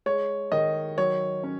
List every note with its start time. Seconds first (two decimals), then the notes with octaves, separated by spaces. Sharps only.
0.06 G#3 C#5
0.52 D#3 D#5
0.98 F#3 C#5
1.44 C#4